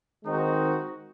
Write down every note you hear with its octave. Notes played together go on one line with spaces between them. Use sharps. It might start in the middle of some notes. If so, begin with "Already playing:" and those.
D#3 G#3 C4 D#4 F#4